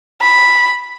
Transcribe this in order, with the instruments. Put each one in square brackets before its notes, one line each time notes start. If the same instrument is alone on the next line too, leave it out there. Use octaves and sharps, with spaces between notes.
[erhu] B5